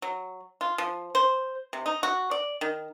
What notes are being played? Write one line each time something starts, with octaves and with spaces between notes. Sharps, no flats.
F#3
F4
F3
C5
C3
D#4
F#4
D5
D#3